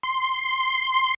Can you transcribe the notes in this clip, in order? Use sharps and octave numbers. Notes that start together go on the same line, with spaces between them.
C6